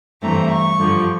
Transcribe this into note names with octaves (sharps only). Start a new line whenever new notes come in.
G2 E3 A3 C4 A#5
C#6
G2 D3 F3